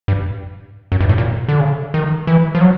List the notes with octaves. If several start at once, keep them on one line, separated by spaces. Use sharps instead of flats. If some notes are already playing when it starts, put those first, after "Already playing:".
G2
F#2
G2
A2
A#2
D3
C#3
D#3
E3
F3
F#3